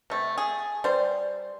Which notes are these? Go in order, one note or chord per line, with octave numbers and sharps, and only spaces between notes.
C3 A3
G#4
G3 C5